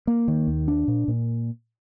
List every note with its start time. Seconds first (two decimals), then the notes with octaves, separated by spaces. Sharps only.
0.07 A#3
0.28 D#3
0.47 D#2
0.68 D4
0.88 A#2
1.08 A#2